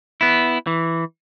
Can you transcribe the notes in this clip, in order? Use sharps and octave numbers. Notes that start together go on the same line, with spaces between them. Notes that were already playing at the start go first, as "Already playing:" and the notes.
B3 E4
E3